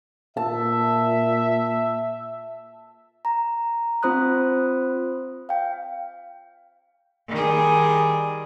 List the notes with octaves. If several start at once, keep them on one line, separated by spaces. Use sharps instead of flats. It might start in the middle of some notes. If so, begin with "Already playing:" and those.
A#2 E5 A5
A#5
C4 F4 C5 B5 D#6 F#6
F5 G5
D#3 G3 G#4